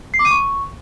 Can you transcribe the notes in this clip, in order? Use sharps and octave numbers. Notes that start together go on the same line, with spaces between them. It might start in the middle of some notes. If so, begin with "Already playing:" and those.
C7
D6
D#7
C#6